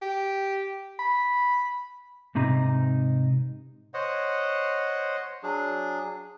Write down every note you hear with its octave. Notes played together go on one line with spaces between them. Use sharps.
G4
B5
G#2 C3 D#4 A#5
C5 C#5 D#5 F#5
F#3 D4 G#4